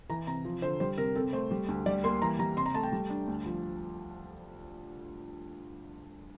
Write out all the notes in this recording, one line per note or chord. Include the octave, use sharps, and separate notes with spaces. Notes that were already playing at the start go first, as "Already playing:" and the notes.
E3 A#5
C3 A#5
F3
D3 C5
G3 C5
C3 A#4
C4 A4
A3 C5
G3
D2
G3 D5
A#3 C6
E3 A#5
G3 A#5
C3 C6
A#5
A3 A5
G5
G3
D4
D2
F3